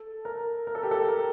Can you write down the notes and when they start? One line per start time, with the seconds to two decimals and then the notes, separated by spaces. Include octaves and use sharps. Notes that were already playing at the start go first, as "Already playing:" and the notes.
Already playing: A4
0.25 A#4
0.67 A#4
0.75 A4
0.83 G4
0.91 A4
1.09 A#4